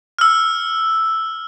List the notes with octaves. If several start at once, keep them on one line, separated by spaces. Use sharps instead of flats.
E6 F6